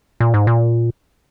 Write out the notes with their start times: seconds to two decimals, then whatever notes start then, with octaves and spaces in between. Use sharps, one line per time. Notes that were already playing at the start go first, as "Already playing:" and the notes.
0.20 A#2
0.34 G#2
0.47 A#2